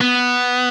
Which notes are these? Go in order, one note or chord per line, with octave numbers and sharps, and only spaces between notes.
B3